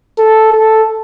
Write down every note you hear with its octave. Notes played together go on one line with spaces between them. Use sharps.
A4
A4